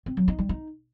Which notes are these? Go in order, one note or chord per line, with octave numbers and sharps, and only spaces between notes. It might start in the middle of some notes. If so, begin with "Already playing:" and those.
C4
F#3
D#4
G3
D#4